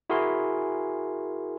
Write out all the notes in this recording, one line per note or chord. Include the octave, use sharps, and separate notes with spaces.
E4 F#4 G#4 A#4 G#5 C6